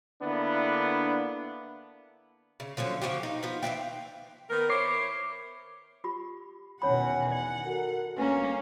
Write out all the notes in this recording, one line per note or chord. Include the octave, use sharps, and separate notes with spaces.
D3 A#3 B3 D4 E4
C#3
D3 F3 F#3 C#4
C#3 F3 F#4 G4
D#4
F3 B3
E3 F#3 F5 G5
D#3 B3 A#4
E4 C5 C#5 D6 C7
F4 G4 B5
E2 B2 D#3 C#4 C#5 F#5 G#5 B5
D5 F#5
F#4 A4 A#4
G1 A#3 C#4 B4 G#5 A#5